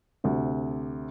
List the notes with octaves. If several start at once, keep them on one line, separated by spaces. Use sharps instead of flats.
D2 C3